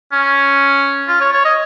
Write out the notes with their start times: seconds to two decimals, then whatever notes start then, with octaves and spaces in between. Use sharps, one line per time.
0.12 C#4
1.08 F4
1.20 C#5
1.33 C#5
1.45 D#5